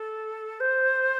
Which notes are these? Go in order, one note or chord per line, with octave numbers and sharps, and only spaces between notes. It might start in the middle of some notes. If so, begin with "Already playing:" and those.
Already playing: A4
C5